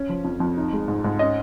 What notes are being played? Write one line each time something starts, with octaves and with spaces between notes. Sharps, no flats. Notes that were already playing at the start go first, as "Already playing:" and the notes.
Already playing: C#4
F3
F2
F2
D#4
G#3
G#2
G#2
C#4 D#5